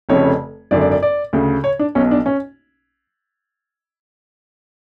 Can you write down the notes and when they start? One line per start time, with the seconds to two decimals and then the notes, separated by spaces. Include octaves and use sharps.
0.09 F1 F2 C#3 C#5
0.71 G#1 F#2 D3 D5
0.81 D5
0.91 D5
1.03 D5
1.33 D2 C#3
1.64 C#5
1.79 D4
1.95 B1 B2 C#4
2.11 D4
2.26 C#4